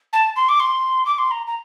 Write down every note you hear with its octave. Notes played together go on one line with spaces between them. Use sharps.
A5
C6
D6
C6
D6
C6
A#5
A#5